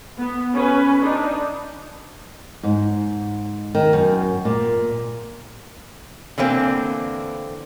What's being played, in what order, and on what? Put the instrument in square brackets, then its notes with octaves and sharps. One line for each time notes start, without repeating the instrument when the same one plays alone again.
[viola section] B3
C#4 B4
D4 D#4
[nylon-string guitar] G#2
D#3
F#2
A#2
[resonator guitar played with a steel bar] D3 E3 A#3 C4